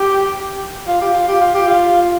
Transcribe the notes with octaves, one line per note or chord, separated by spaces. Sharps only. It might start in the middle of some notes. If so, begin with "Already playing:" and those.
Already playing: G4
F4
G4
F4
G4
F4
G4
F4